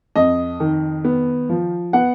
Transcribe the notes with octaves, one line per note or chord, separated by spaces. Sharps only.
F2 D#5
D#3
B3
F3
B3 F#5